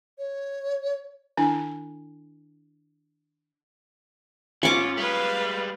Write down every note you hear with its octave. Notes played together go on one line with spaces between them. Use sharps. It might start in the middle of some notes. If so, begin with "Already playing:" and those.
C#5
D#3 D4 E4 G#5
G#2 C#4 F4 C#6 D6
G3 G#3 B4 F5